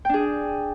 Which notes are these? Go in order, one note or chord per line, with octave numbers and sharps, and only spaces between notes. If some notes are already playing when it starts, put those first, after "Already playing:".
D4 G#4 G5